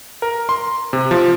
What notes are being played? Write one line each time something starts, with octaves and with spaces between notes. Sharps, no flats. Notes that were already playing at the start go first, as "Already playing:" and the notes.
A#4
C6
C3
F3